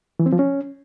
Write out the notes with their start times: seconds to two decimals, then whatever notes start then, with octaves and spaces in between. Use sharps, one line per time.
0.19 E3
0.26 C4
0.33 F3
0.39 C#4